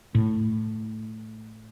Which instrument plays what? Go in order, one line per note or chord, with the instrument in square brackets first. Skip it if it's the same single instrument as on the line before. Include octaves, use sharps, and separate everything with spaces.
[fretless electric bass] A2